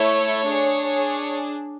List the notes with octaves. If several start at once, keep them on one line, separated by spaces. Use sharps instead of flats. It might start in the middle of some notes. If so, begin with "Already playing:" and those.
Already playing: A3 E4 A4 C#5
D4 G#4